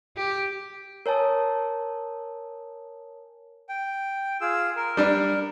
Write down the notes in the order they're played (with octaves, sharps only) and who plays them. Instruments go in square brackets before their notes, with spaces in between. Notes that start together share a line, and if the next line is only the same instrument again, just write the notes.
[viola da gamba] G4
[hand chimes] A#4 C#5 G#5 A5 D#6
[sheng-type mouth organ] G5
F4 G#4 E6
A#4
[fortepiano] G3 D4